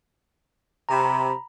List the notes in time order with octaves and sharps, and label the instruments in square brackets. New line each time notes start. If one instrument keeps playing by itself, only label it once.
[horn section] C3 [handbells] A#5 B5